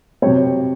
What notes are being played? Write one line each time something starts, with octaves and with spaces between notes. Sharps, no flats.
C3 F#3 C4 C#5